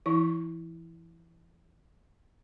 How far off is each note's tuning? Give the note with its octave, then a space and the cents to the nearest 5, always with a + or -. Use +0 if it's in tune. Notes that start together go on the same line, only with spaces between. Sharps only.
E3 +25 E4 -10